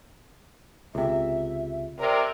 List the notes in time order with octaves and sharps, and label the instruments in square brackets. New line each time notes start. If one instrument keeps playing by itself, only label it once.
[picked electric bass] C#2 C3 [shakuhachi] E5
[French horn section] C3 A#4 [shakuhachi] D5